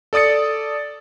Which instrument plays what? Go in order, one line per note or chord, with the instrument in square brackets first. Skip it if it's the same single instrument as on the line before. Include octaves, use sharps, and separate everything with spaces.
[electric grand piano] A4 D5 D#6 A6 C#7